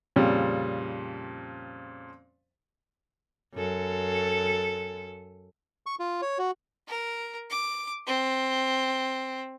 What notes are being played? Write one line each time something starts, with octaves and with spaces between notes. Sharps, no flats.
F2 A#2 C#3 G3
F#2 A4
C#6
F4
C#5
F#4
A#4
D6
C4